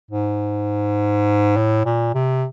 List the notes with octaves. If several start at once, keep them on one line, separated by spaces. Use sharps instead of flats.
G#2
A2
A#2
C3